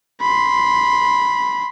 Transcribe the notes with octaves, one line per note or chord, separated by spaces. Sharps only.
B5 C6